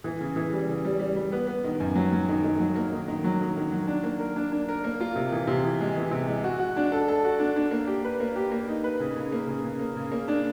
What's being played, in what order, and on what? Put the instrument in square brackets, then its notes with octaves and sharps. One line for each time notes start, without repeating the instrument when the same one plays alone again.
[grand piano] E3
C#3
E3
G3
C#3
G3
G3
G3
B3
B3
D#3
F#2
F#3
F#3
D#3
D#3
F#3
A#3
D#3
D#3
F#3
D#3
D#3
F#3
D4
A#3
A#4
D4
D4
A#4
A#3
F4
C3
E3
C3
E3
G#3
E3
C3
G#3
F#4
F#4
D4
A4
A4
F#4
D4
D4
A#3
G4
B4
A#3
G4
A#3
D#4
B4
C#3
C#3
A#3
C#3
C#3
A#3
C#3
A#3
D4